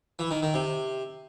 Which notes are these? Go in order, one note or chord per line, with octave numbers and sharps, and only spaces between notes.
E3
D#3
D#3
C3